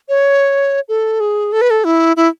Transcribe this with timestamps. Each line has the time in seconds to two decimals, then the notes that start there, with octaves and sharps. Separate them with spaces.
0.09 C#5
0.89 A4
1.20 G#4
1.52 A4
1.61 B4
1.70 A4
1.84 E4
2.17 E4